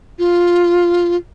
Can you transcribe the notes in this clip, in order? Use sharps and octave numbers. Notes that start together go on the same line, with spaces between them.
F4